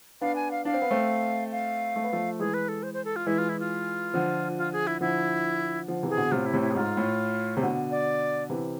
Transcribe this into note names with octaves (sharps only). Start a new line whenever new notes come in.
B3 D4 F5
G#5
F5
D4 F5
C4
B3
A3 C4
F5
A3
B3
F3 A3
E3 G#3 G#4
B4
A4
C5
C5
A4
F4
E3 G#3 E4
F4
E4
F4
D3 F3
F4
G#4
E4
D3 F3 E4
D3 F3
C3 E3
G#4
B2 D3
A2 C3 F4
E4
A2 C3
E4
G#4
G#2 F4
A2
C3
B2 D3
D5
C3 E3